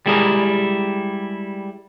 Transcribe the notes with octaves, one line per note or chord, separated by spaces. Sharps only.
G3 G#3 E4 G4 G#4 A#4